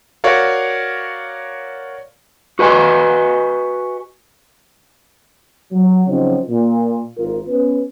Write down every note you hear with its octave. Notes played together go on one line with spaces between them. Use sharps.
F#4 A#4 C#5 D5 F5
F#4 B4 D#5 G#5
F#3
C#3 F3 F#3 C4 D#4
A#2
G#1 F4 A#4
B3 C#4 B4